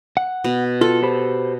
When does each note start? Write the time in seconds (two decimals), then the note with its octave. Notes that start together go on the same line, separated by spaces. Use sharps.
0.17 F#5
0.44 B2
0.81 F4 A4
1.02 G4 C5 B5